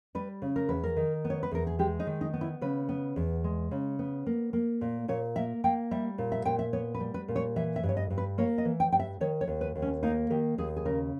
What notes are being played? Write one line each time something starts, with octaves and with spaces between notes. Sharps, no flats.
G3 B4
C#3
A#4
E2 B4
A#4
D#3
B3
C#5
B4
E2 A#4
G#4
G#3 G4
D#4
D#3
D#4
B3
E4
C#3 B4
B3
E2
G#3
C#3
B3
A#3
A#3
A#2
A#2 C#5
A#3 E5
A#3 G5
G3 E5
A#2
E5
A#2 G5
E5
B3 C#5
B4
G3
B4
A#2
C#5
E3 E5
E5
G2
C#5
D#5
G2
B4
A#3 C#5
D#5
E3
G5
G2 G5
E5
D#3 C#5
C#5
D#2
B4
D#2
C#4
A#3 D#4
D#3 G4
D#2 G#4
G#4
C#3 A#4